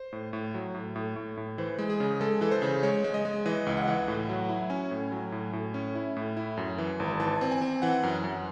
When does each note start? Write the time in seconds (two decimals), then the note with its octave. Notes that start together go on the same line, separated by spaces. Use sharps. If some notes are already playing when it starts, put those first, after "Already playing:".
Already playing: C5
0.13 A2
0.33 A2
0.54 F#3
0.75 A2
0.96 A2
1.16 A2
1.37 A2
1.58 E3 C5
1.79 G#3
1.90 G#4
2.00 C#3
2.21 G#3 A4
2.41 E3 A4
2.51 C5
2.62 C#3
2.83 G#3 C#5
3.04 G#3
3.14 D#5
3.25 G#3
3.46 E3 D#5
3.66 C#2
3.77 F#5
3.88 E3
4.08 A2
4.29 F#3
4.49 E4
4.70 C#4 G#5
4.91 A2
5.12 F#3
5.32 A2
5.53 A2
5.74 C#4
5.95 E4
6.17 A2
6.37 E4
6.57 F#2
6.78 E3
7.00 G#1
7.20 E3 A5
7.41 C4
7.51 G#5
7.62 C4
7.82 E3 F#5
8.03 F#2
8.24 F#2